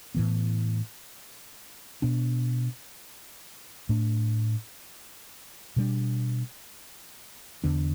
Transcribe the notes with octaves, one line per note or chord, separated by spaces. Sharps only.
A2 E3 B3
B2 B3 D4
A2 A3 D4
B2 G3 B3 D4
E2 D3 B3 D4